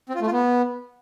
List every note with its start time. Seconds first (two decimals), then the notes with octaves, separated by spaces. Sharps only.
0.09 C4
0.15 F4
0.21 A3
0.26 F4
0.32 B3